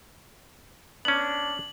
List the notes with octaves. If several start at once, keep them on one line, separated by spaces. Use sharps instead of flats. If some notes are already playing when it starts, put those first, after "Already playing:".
B3 C#4 D4 F#7